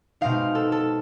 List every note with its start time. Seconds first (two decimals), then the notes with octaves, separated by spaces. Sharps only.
0.21 B2 G#3 C4 D#4 F5
0.55 A4
0.72 A4